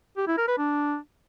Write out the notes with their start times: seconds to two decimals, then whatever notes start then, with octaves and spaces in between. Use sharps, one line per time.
0.17 G4
0.27 E4
0.38 A#4
0.48 B4
0.58 D4